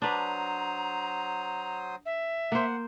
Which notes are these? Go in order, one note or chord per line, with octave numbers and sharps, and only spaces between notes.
F#3 D4 B4 C5 A#5 D#6
E5
A#3 C5 F#5